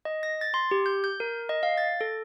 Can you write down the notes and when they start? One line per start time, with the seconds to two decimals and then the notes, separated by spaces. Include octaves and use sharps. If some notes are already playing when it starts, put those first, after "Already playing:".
0.05 D#5
0.23 A#6
0.41 A6
0.54 C6
0.71 G4
0.86 G6
1.04 G6
1.20 A#4
1.49 D#5
1.63 F5
1.78 A6
2.01 A4